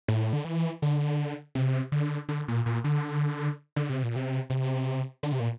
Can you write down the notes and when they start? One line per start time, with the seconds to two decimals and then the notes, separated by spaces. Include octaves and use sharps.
0.08 A2
0.33 D3
0.45 E3
0.82 D3
1.55 C3
1.92 D3
2.29 D3
2.48 A#2
2.66 A#2
2.84 D3
3.76 D3
3.89 C3
4.03 A#2
4.16 C3
4.50 C3
5.23 D3
5.32 C3
5.40 A#2